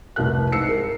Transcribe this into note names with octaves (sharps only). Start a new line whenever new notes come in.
F1 C2 A#4 F#6
G#2 E6 C7 C#7
A#4